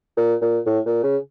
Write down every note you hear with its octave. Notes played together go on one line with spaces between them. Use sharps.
A#2
A#2
A2
A#2
C#3